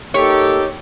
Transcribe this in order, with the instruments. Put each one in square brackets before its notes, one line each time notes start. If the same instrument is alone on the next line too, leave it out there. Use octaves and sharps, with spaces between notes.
[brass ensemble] A#3 D#4 G4 [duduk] A4 [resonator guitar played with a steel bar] C#5